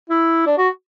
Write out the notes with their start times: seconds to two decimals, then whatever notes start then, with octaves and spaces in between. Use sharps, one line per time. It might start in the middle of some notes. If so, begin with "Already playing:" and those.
0.10 E4
0.46 D4
0.58 F#4